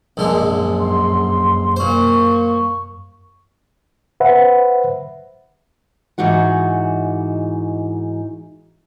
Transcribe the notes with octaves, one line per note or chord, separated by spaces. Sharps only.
A#1 F#2 D3 G#3
C6
A#2 C5 C#6
B4 C5 E5 F#5
G#2 E3 D#4 F#4 F#5